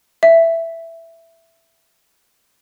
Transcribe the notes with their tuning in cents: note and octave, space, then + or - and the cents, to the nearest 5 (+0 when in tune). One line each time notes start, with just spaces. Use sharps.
E5 +10